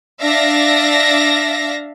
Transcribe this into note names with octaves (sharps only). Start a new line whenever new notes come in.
D4 E5 F5 A#6